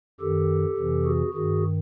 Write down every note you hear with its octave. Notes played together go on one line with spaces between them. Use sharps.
F#2 D#3 G4 A4
F2 C3 E3
F#4 G#4
G2 D#3 F#4 G#4